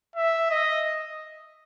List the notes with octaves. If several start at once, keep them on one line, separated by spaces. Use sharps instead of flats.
E5
D#5